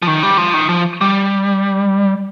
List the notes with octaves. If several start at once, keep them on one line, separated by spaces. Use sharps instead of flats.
F3
D#3
G3
F3
D#3
F3
G3